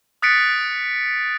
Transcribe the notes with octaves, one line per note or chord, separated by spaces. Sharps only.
D#6 F#6 A6 B6 C#7 D7